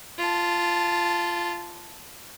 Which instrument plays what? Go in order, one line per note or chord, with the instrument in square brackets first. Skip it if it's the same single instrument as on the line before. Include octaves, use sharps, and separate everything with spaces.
[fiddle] F4 A5